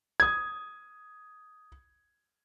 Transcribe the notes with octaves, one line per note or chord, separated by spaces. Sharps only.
D#6 G#6